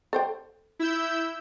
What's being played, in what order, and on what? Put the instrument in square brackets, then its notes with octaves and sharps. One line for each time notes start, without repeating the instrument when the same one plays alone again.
[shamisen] A4 C5 G5
[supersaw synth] E4 E6 G6